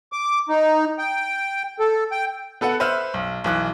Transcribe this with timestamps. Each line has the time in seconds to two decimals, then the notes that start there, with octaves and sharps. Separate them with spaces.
0.13 D6
0.49 D#4
0.99 G5
1.80 A4
2.12 G5
2.61 B3 A4 B4 F#5
2.80 B4 C5 E5 F6 F#6
3.14 B1
3.44 B1 E3 F#6